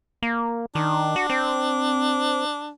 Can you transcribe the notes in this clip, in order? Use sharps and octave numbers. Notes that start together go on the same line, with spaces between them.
A#3
D#3 D4
F#4
C4